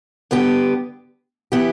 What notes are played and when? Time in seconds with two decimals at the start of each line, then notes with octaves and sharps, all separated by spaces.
0.31 G2 D3 B3 G4
1.52 E3 B3 E4 G4